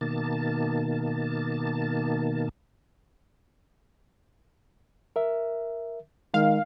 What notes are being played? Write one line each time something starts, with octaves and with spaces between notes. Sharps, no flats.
B2 D#3 A#3 A5
A#4 E5
D#3 G#3 F5